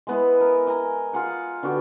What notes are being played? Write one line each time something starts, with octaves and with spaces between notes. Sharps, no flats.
G#3 B3 E4
A#4
D#5 G#5 A#5
F4 G#4 F#5
D3 B3 F#4 G4